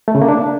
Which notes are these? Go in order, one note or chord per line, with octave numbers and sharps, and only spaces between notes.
A3
C#3
A#3
D4